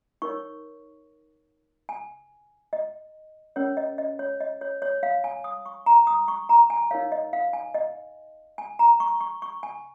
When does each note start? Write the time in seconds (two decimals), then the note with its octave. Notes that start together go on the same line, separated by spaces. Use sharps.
0.22 D#4 A#4 C#5 C#6
1.89 G#5
2.73 D#5
3.56 C#4 A#4 C#5
3.77 D#5
3.98 D#5
4.19 C#5
4.40 D#5
4.61 C#5
4.82 C#5
5.03 F5
5.24 G#5
5.44 D#6
5.66 C#6
5.86 A#5
6.07 D#6
6.28 C#6
6.49 A#5
6.70 G#5
6.91 D#4 A#4 C#5 F5
7.12 D#5
7.33 F5
7.53 G#5
7.74 D#5
8.58 G#5
8.79 A#5
9.00 C#6
9.21 C#6
9.42 C#6
9.63 G#5